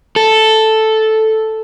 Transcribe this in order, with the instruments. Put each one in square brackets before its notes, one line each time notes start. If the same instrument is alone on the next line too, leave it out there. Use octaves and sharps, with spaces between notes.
[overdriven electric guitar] A4